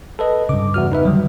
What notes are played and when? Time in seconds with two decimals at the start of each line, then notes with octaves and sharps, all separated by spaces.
0.19 A4 B4 D#5
0.49 G2 C#3 D6
0.74 E2 F#4 F6
0.92 D#4 B4 E5
1.05 D3 D#3 F#3 G3